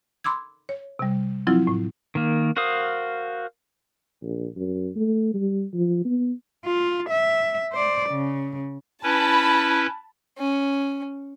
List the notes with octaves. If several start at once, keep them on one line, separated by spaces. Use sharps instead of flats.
B5 C6 D6 E6 G#6
C#5
C3 G3
F3 F#3 C4 E4 F4
A2
D#3 A#3
F#4 A#4 C5 F5 D#6
A#1
F#2
A3
G3
F3
B3
F4
E5
C5 D5
C#3
C#4 E4 B4 A5 B5
C#4